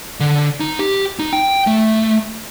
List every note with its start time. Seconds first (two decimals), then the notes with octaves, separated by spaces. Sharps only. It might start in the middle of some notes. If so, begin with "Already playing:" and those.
0.20 D3
0.60 D#4
0.79 G4
1.19 D#4
1.33 G5
1.67 A3